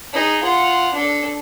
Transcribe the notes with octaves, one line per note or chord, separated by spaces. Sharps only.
D#4 G#4
F4 F#5
D4 A4